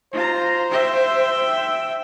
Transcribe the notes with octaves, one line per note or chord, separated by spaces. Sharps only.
F4 C5 A#5
E5 G5